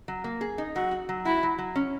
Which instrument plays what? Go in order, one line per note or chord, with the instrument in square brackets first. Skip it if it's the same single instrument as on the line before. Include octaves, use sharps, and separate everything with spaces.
[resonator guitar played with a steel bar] F#3
A#3
G#4
D#4
[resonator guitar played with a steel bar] F#3 [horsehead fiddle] F#4
[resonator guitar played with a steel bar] F#4
F#3
[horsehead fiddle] E4 [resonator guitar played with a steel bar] F#4
[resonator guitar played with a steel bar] F#3
F#3
C#4